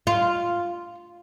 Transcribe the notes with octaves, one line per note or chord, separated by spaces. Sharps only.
F4